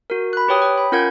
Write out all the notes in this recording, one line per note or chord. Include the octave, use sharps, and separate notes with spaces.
F#4 A#4
B5 F#6
G4 B4 C#5 G5 D#6
G5
B5
C#4 F4 A#4 F#5 G6 G#6